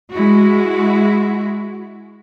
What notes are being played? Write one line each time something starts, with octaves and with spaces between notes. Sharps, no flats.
G#3 E4 F#4